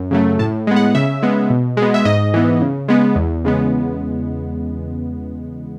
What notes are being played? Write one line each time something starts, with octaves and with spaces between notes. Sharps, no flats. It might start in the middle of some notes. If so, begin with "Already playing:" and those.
Already playing: F#2
C#3 F#3 A3
A2 A5
G#3 B3
F#5
C#3 E5
G#3 B3
B2
G#3
B3
E5
G#2 D#5
E3 B3
C#3
G#3 B3
E2
C#3 G#3 B3